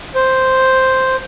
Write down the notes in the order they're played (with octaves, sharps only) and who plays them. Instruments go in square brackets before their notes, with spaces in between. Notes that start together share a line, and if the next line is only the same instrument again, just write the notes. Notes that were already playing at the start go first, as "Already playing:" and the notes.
[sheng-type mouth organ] C5